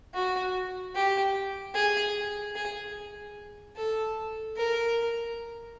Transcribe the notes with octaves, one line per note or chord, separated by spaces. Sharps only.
F#4
G4
G#4
G#4
A4
A#4